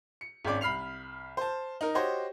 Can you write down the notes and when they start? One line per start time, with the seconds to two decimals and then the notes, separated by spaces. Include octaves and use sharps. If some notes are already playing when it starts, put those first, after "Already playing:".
0.21 C#7
0.45 G#1 G#3 C#4 D5 D6
0.61 C2 B5 F6 C7 F7
1.37 C5 A5
1.81 D#4 A#4
1.95 F#4 G4 C5 C#5 D#5